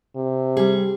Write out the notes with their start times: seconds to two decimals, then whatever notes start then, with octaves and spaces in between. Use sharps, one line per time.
0.16 C3
0.57 G3 G#4